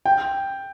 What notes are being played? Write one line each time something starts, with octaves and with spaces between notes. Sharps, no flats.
G5